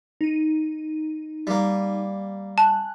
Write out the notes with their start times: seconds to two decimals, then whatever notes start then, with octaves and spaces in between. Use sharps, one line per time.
0.21 D#4 D#7
1.47 G3 A#3
2.58 G#5 A5 F#6